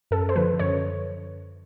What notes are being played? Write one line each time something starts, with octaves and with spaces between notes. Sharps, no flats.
F#2 A4
C5
D3 F3 B4
F#2 C#5